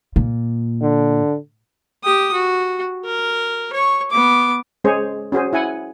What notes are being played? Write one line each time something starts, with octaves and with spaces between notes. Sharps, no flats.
A#2
D3
G4 D#6
F#4
A#4
C#5 C#6
B3 D6
G#3 C#4 G#4 C5 C#5
C#4 F#4 G#4 C5
E4 F#5 G#5